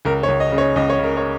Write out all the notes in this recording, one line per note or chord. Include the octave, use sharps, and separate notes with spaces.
C#2 A#4
C#5
C#2
D#5
C#3
C#5
C#2 D#5
C#5
C#3 A#4
C#5